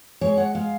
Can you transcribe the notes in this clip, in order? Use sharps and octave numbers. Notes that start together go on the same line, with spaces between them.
G#3 C#5
F#5
G#3 F5